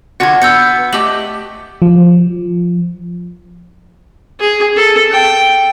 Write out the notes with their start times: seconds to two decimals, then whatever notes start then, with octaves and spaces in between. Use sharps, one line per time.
0.20 D3 F4 F#4 F#5 G#6
0.42 B3 E6 G6 C#7
0.93 A3 G4 D#5 F#7
1.82 F3
4.40 G#4
4.76 A4
5.11 G5